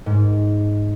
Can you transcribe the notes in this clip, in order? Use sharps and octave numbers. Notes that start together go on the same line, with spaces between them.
G#2